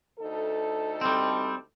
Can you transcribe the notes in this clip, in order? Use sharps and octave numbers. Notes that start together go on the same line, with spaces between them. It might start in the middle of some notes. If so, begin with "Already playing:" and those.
D2 D#4 A4
G3 C4